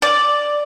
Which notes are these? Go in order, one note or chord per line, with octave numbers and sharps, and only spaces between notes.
D5